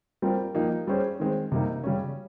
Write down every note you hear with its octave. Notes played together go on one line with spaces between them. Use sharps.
G3 C4 F4 A#4
F3 A#3 D#4 G4
G3 C#4 G#4 C5
D#3 G#3 C4
C3 G3 A#3 D#4
C#3 G3 C#4